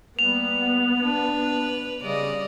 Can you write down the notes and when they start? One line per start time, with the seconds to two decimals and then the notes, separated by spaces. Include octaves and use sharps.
0.19 G3 A#3 B3 F7
1.00 D4 B4
2.03 C#3 G3 D5 D#5